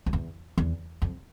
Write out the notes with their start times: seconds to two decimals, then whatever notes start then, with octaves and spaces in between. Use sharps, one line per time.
0.06 F2
0.13 E2
0.58 E2
1.02 F2